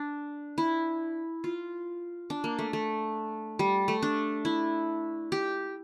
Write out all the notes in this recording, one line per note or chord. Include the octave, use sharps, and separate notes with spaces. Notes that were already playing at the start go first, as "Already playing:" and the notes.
Already playing: D4
E4
F4
D4
A#3
A3
A3
G3
A3
D4
E4
G4